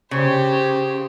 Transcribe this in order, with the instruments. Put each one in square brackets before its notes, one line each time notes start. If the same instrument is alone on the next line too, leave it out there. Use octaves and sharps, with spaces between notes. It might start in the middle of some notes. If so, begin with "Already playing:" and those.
[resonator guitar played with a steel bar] C#3 [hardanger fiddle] G4 C5